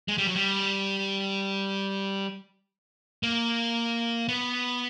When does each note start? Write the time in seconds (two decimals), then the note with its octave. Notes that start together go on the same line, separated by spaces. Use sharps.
0.08 G#3
0.18 G3
0.27 F#3
0.35 G3
3.23 A#3
4.28 B3